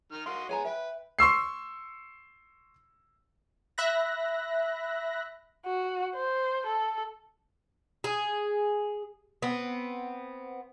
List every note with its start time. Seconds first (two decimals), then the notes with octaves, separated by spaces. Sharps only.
0.12 D#3 F6
0.26 F#4 A#4 D#5 F5 C6
0.49 G#3 B3 C#5 G#5 A#5
0.64 B4 E5 G5
1.19 C6 C#6 E6 C7
3.78 E5 B5 F#6 A#6
5.66 F#4
6.15 C5
6.66 A4
8.04 G#4
9.42 B3 C4